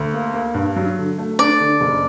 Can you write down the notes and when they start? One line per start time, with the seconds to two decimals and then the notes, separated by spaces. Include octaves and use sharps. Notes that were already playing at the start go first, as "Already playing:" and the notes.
Already playing: D2
0.13 A#3
0.34 A#3
0.54 G2
0.76 F#3
0.98 D3
1.19 A3
1.39 D4 D5
1.60 D3
1.81 F#1